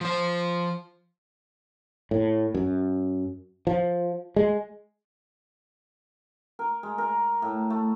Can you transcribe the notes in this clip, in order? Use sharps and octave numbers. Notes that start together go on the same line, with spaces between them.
F3 C5
A2
F#2
F3
G#3
A#4
G#3
A#4
A2
A3